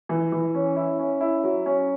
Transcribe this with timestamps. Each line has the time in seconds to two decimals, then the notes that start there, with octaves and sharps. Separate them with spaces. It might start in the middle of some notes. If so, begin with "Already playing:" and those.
0.09 E3
0.32 E3
0.54 C#4
0.76 E4
0.99 C#4
1.21 E4
1.44 F#3
1.66 C#4